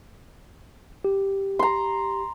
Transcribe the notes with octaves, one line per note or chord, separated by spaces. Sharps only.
G4
A#5 C6